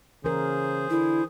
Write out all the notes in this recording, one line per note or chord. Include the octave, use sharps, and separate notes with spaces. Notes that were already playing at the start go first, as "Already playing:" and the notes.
C#3 E3 G#4 A#4 C5
D3 E4